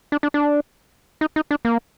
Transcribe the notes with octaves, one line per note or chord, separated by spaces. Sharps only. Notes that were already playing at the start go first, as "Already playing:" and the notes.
D4
D4
D4
D#4
D#4
D4
A#3